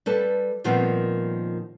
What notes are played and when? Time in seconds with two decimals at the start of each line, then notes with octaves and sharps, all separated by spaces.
0.06 G3 A4 B4 A5
0.64 A#2 D#3 F3 G3 B3 C4